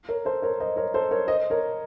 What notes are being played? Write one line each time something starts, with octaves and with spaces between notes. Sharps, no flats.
A#4 C#5
A4 C5
A#4 C#5
C5 D#5
A#4 C#5
A4 C5
A#4 C#5
C5 D#5
A#4 C#5